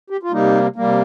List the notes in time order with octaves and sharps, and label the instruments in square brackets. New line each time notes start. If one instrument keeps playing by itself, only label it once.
[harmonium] G4
F4
C3 G3 A#3 D#4
C3 G3 A#3